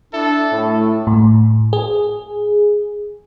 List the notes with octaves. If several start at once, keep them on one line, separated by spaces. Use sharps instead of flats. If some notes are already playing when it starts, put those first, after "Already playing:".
D4 E4 A4
A2 A3
A2
G#4